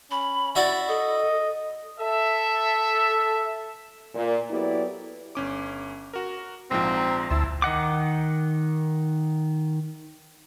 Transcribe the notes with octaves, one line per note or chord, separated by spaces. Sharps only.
C#4 B5
E4 F#4 D5 E5
A4 D#5
A4 E5
A#2
F#3 B3 E4 G4 A4 D5
G1 C#4 D6
F#4 A#4
A#1 G#2 F3 C4 A#5
D2 E4 A5 C6 E6
D#3 D#5 F#5 D6